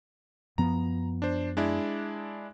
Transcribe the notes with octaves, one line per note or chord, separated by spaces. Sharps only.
F#2 F3 B3 A#5
D4 C5
G#3 D4 E4